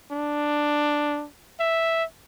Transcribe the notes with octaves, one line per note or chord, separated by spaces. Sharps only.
D4
E5